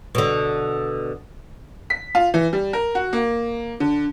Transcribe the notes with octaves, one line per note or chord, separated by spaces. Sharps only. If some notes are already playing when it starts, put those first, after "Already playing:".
B2 D3
B6
F4
E3
G3
A#4
F#4
A#3
D3